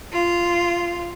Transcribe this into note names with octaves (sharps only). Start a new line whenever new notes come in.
F4